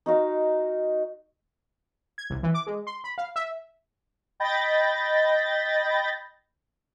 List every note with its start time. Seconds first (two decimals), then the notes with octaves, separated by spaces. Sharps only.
0.06 D#4 F#4 F5
2.18 G#6
2.30 C2
2.43 E3
2.54 D6
2.67 G#3
2.87 C6
3.04 B5
3.18 F5
3.36 E5
4.40 D#5 G5 B5 G6 A6 A#6